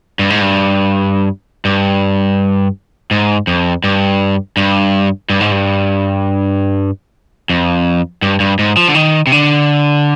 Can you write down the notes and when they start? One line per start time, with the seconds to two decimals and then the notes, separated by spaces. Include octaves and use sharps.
0.19 G2
0.30 G#2
0.41 G2
1.65 G2
3.11 G#2
3.47 F2
3.84 G2
4.57 G2
5.30 G2
5.41 G#2
5.52 G2
7.49 F2
8.22 G2
8.40 G2
8.59 G#2
8.77 F3
8.88 D3
8.95 D#3
9.27 C3
9.32 D3